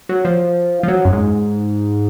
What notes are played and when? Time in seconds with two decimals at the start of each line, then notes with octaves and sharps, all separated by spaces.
0.09 F#3
0.25 F3
0.83 F3
0.88 F#3
1.05 F#2
1.13 G#2